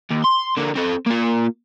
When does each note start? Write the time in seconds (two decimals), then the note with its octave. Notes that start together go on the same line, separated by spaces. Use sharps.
0.10 D#2
0.24 C6
0.57 D3 A#3
0.75 C4 A4
1.06 A#3 F4